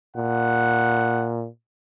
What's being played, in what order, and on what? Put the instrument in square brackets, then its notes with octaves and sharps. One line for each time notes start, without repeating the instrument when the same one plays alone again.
[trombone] A#2 [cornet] F#5